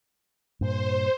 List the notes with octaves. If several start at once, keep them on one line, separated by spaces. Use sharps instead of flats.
G2 A#2 C5